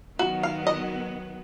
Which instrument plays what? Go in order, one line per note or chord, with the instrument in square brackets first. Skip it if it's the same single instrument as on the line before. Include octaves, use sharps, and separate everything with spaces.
[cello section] D#3 F#3 B3 [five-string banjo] F#4
[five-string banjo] F5
D#5